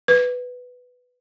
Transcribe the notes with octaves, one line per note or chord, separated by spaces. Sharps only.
B4